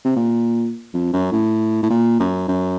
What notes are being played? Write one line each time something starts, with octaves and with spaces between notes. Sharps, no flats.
C3
A#2
F2
F#2
A2
A2
A#2
F#2
F#2